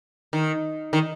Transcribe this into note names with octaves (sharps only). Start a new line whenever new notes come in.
D#3
D#3